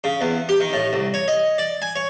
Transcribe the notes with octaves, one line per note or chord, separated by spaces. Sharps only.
C#3
E2
G4
D#3
A2
C2
C#5
D#5
D5
G#5
C#5